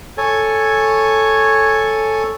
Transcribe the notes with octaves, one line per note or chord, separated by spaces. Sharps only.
A4 C#5 G#5